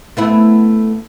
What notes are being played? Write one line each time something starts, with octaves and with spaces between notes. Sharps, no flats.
A3 B3 E4